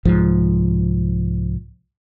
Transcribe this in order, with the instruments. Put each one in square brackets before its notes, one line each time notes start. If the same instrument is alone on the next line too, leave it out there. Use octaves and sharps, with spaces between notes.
[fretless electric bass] C2 G#2 F3